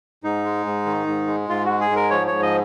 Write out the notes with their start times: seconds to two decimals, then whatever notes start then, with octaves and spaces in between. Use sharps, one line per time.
0.24 G#2 D#4
0.44 G#3
0.66 G#2
0.86 D#3
1.07 G#2
1.27 G#3
1.49 G#2 F4
1.65 G#3 F#4
1.80 G#4
1.90 G#2
1.96 A#4
2.10 F3 C#5
2.27 G#2 C#5
2.42 D#5